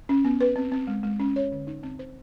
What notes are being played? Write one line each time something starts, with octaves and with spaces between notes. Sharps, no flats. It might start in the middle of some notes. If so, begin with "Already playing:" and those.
C#4
B3
B4
C4
C4
G#3
G#3
C#4
C#5
D3
D#4
C4
C5